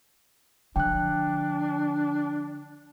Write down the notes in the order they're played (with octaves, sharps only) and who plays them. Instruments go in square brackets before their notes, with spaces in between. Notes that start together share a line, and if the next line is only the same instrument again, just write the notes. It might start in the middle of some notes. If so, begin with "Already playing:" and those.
[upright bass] D3 F3 [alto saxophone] D4 [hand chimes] G5 F#6